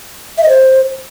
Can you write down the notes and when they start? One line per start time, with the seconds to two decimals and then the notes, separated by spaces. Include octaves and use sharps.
0.38 E5
0.43 D#5
0.49 C5